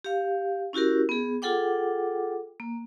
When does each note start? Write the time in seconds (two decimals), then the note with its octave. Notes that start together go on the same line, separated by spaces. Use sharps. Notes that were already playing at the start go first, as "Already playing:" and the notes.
0.04 G4 F5
0.73 C#4 E4 F#4 G4 A#4
1.09 B3 G#4
1.42 F4 G#4 A4 F#5 G5 D6
2.60 A#3